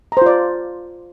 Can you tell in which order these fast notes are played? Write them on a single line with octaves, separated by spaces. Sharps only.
A#5 C5 F4 D5